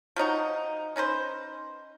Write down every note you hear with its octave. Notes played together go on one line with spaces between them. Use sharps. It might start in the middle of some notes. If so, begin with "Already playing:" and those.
F3 F#3 D#4 F#4
C#4 D#4 B4 C5